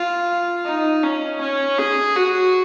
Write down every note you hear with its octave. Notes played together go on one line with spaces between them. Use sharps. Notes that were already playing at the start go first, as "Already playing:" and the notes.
Already playing: F4
D#4
C#4
C#4
G#4
F#4